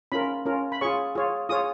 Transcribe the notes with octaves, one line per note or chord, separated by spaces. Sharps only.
C#4 F4 A#4 B5
C#4 F4 A#4
B5
F4 G#4 C#5 C#6
F4 G#4 C#5
F4 G#4 C#5 D#6